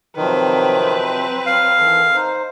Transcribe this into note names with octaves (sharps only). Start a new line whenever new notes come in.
C3 D#3 F3 F#3 C4 B4
F#3 F5
D#3 E3 A4
D#4 C5